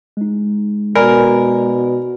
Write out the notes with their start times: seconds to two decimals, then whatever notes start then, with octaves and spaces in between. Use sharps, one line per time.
0.17 G#3 D#4
0.95 B2 A#4 D5 G#5 B5